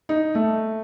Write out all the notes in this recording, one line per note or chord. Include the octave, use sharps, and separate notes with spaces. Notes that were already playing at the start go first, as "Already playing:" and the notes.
D#4
A3